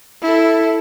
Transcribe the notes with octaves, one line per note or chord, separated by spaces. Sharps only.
E4 A4